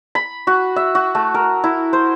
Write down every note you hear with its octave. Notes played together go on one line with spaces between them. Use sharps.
B5
F#4
E5
F#4
A3
A#4
E4
C5